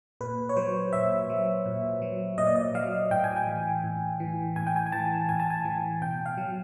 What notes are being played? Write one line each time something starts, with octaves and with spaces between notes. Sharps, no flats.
A#2 B4
C#5
F#3 C5
A#2 E5
F#3
A#2
F#3
A#2 D#5
D5
D#5
F#3 F5
A2 G5
G#5
G5
E3
A2
E3
A2 G#5
G5
G#5
G#5
E3 A5
A2 G#5
A5
G#5
E3
B2 G5
F5
F#3